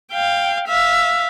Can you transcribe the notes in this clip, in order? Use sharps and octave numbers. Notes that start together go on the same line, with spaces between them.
F5 G5
E5 F5